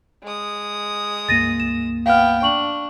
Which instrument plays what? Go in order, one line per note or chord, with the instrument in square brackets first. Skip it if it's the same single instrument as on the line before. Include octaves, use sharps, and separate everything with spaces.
[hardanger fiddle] G#3 D#6
[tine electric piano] C#2 G2 A#3 [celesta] A6 A#6 D#7
[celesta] E7
[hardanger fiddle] B3 G5 [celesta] F5 F6
[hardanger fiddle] D4 [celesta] C#6 F#7